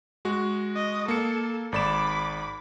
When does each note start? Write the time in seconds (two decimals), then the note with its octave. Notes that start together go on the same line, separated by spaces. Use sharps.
0.25 G#3 F#4
0.75 D#5
1.08 A#3 A4 C#7
1.72 G#1 D5 B5 D6 E7